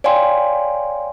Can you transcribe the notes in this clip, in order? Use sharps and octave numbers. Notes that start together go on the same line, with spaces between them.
C#5 D5 F5 G5 G#5 C6